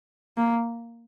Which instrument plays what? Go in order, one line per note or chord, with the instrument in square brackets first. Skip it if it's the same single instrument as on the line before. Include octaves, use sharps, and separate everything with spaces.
[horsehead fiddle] A#3